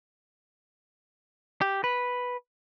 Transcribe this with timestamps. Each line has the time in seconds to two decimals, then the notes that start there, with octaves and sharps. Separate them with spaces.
1.61 G4
1.84 B4